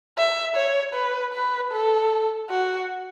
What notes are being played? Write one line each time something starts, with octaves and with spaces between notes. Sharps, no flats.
E5
C#5
B4
B4
A4
F#4